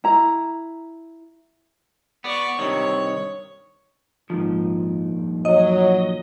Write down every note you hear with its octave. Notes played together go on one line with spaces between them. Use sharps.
E4 A#5
B3 D5 C#6
G2 C3 D#3 C#5
G#1 A#2 D#3 F3
G2
F#3 D#5